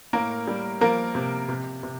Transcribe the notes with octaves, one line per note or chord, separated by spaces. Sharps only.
A2 A#3 A#4
G3
F3 A#3 A#4
C3
C3
C3